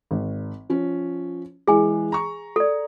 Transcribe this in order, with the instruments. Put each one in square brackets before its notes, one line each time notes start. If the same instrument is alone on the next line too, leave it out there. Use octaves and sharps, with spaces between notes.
[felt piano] G#1
F3 C#4
[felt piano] E3 G#3 [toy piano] G#4 G#5
[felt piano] A#5 C#6
[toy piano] A4 D5